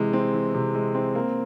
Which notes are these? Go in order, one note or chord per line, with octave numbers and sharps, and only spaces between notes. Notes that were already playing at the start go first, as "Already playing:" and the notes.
Already playing: C3 E3 G#3
C4
E3
C3
G#3
C4
A#3